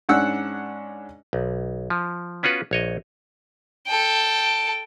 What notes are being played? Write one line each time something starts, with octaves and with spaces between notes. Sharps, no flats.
G#2 C#4 D4 F#5 E6 F#6
B1
F3
B3 C#4 F4 F#4 B4
A#1 C#5 D#5
A4 G5